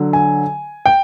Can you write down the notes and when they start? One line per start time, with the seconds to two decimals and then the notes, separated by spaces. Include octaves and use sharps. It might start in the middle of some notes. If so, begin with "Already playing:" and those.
Already playing: D3 F#3
0.13 G#5
0.86 G5